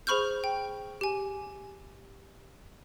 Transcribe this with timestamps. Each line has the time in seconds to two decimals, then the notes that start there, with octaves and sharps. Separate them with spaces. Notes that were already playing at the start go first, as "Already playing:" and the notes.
0.07 G#4 C5 B5 C#6 F6 G6
0.44 G5
1.01 G4 G#5